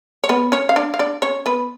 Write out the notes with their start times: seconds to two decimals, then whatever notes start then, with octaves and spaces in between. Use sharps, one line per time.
0.24 C#5
0.29 B3 B4
0.52 C#4 C#5
0.69 F5
0.76 D4 D5
0.94 F5
0.99 D4 D5
1.22 C#4 C#5
1.46 B3 B4